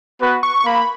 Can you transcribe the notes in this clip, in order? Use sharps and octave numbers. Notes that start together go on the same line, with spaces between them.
B3 F#4 B4
C#6
C#6
A#3 B5